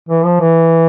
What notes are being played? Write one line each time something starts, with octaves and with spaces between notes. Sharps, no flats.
E3
F3
E3